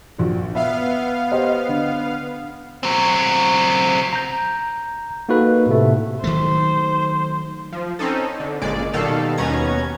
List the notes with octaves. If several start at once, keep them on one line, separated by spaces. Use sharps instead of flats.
A#1 F#4
B3 E5 F5
G4 C5 D#5
D3
F#3 C4
A#5 G6
A#3 D#4 F#4 A4 B4
A2 C3 A3
D#3 F#3 A3 C5
F3
C4 C#4 D#4 A4
D3
G1 A#2 C#3 G#3 D5
B2 D#3 G3 A4 F5
D#2 B2 B3 C#4 A#5 G#6